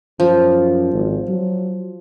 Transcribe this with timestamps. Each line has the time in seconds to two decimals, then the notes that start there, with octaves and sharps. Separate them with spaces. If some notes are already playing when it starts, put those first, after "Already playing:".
0.20 F#2 F3
0.93 G#1
1.29 F#3